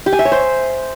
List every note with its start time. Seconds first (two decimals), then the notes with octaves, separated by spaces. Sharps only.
0.06 G4
0.13 G#5
0.19 E5
0.25 C#5
0.32 C5